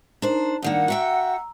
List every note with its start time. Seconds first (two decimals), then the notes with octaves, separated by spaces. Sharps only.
0.22 D4 D#4 A#4 C5 A#5
0.62 G2 D#3 A#3 D4 D5 F#5
0.88 F#4 E5 G5 A#5 E6